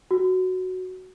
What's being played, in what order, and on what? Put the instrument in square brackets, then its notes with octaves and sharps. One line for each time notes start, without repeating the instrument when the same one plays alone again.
[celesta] F#4